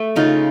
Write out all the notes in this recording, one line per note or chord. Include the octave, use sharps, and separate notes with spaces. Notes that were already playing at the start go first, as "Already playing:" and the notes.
Already playing: A3
C#3 D#4 F4